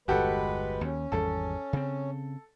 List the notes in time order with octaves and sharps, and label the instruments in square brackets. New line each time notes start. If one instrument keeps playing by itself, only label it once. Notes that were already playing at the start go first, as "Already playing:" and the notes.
[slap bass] G1 E2 [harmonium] G#3 B4 [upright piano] F#4 G4 A4
[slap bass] D#2 [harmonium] C#4
[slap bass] G#1 E2 G3 [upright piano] A4
[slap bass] C#3 C4